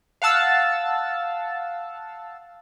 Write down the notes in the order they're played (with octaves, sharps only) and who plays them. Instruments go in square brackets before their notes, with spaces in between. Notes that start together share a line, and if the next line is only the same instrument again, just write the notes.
[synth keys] F5 F#5 A5 E6 A6